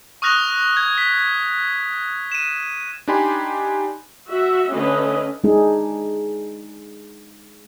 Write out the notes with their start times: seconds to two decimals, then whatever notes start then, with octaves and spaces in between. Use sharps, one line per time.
0.22 C#6 D#6 F6 F#6 A#6 F7
0.77 G#6
0.98 B6
2.32 D#7 E7
3.08 D4 D#4 G4 G#5 B5 C6
4.27 F#4 E5
4.72 D3 A3 C#4 B4 D#5
5.44 G#3 D4 D#4 G#4